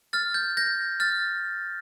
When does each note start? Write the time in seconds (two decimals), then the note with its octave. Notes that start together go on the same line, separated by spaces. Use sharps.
0.13 F6 A6
0.34 G6
0.57 G6 A#6
1.00 F6 A6